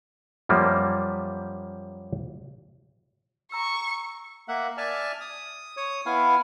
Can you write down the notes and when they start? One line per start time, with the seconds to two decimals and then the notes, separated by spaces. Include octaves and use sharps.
0.49 F#2 F3 G3 A#3
3.52 A#5 C#6 E6
4.48 A#3 E5 F#5
4.78 D5 E5 G#5 A5 F6
5.21 D#6
5.77 C#5 D#6
6.06 B3 E4 F5 G#5